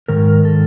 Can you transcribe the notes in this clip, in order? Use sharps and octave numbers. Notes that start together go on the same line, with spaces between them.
G#2 D#3 A#4
A4